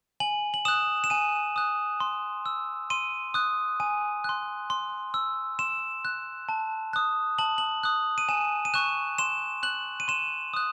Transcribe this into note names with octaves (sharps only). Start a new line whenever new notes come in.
G#5 F#7
F#7
D#6 F#6 E7
E7
G#5 D#7
D#6 F#6
C6
E6
C6 D#7
D#6 F#6
G#5 D#7
C6 F#6
C6
E6
C6 E7
F#6
A5
D#6 F#6
A5 F#7
F#7
D#6 F#6
D#7
G#5 E7
D#7
C#6 F#6 E7
C6 E7
F#6 F#7
D#7
C6 E7
D#6 F#6